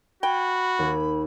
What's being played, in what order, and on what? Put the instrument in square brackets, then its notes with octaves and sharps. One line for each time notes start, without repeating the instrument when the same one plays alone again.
[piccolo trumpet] F#4 [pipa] G5 [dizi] B5 [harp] G#6
[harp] D#2 G#6